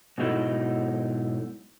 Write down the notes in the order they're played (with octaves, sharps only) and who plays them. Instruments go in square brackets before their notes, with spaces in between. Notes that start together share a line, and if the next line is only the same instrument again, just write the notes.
[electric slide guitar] G#2 B2 F#3 D#4 E4 A4